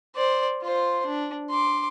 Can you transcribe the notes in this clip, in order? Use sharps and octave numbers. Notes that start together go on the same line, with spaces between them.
C5 D5
F4 C5
D4
C6 D6